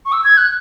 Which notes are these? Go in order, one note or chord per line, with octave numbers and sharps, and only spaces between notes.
C#6
E6
G#6
F#6